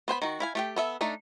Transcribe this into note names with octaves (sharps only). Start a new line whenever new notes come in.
B3 C5 G5 B5
D#3 F#4
E4 F5 G#5
A3 G4 G5
B3 A4 E5
A3 D4 D#4